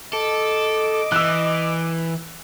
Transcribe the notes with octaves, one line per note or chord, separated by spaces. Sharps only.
A4 D#5 D6
E3 E6 F#6